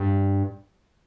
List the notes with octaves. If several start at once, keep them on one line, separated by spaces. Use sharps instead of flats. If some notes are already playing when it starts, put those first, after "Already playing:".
Already playing: G2